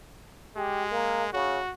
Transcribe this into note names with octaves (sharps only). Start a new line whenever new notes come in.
G#3 G4
A#3
C#3 F#4